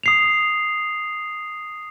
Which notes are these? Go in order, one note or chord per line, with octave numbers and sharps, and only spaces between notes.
D#6 C7 F7